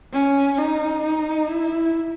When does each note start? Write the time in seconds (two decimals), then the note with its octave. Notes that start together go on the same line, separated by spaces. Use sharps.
0.13 C#4
0.58 D#4
1.03 D#4
1.47 E4